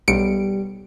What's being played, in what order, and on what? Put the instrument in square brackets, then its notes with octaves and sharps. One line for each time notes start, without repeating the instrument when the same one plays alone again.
[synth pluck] B1 C#7 D7 [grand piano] G3